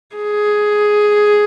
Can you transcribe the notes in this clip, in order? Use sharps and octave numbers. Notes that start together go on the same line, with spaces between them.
G#4